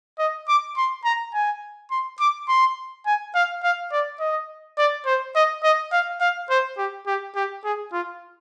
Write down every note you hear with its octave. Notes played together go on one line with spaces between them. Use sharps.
D#5
D6
C6
A#5
G#5
C6
D6
C6
G#5
F5
F5
D5
D#5
D5
C5
D#5
D#5
F5
F5
C5
G4
G4
G4
G#4
F4